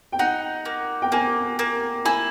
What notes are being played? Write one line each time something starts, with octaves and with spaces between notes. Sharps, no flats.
G5
D#4 F#5
A#3
G5
A#3 G#5
A#3
E4 G#5